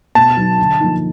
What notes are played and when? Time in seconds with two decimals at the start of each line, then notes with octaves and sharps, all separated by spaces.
0.15 B2 A5
0.37 F#3 B3 D#4
0.58 D3
0.80 F3 A#3 D#4